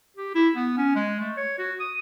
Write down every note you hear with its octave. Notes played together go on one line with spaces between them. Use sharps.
G4
E4
B3
C#4
G#3
A3
C#5
F#4
D#6